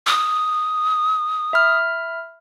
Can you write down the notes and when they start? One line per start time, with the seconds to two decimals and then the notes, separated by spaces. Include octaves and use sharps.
0.07 D#6
1.53 E5 B5 F6